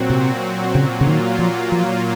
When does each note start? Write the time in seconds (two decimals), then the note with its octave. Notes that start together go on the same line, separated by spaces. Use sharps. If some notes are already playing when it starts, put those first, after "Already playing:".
Already playing: A#2 F#3 C4 F#4
0.10 C3
0.75 A#2 C#3 F#3 A#3 F4
1.01 C#3
1.07 D#3
1.39 F3
1.72 F3